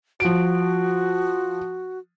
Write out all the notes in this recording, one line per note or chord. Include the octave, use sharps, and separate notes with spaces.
F3 F#4 D7